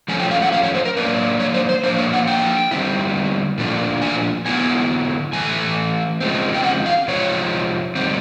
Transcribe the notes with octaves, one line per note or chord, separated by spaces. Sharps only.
F3 A3 C#4 G#5
G5
F5
F#5
F5
C#5
C5
A#4
F#3 A#3 D4 B4
C#5
C5
C5
F3 A#3 D4 C5
C#5
F#5
G5
D3 G3 C4 E4
A#2 F3 A3 D4
G#5
D3 F#3 B3 E4 G#5
A2 E3 A3 G#5
C#3 F3 G#3 C4
G5
F#5
F5
C3 F3 G#3 C#5
D3 G3 C4